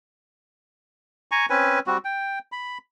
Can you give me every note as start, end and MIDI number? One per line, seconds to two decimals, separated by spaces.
1.31 1.46 80
1.31 1.46 82
1.31 1.46 85
1.50 1.79 60
1.50 1.79 61
1.50 1.79 71
1.50 1.79 80
1.87 1.98 55
1.87 1.98 60
1.87 1.98 66
2.05 2.39 79
2.52 2.78 83